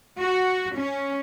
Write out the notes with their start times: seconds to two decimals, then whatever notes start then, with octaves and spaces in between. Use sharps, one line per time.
0.19 F#4
0.77 C#4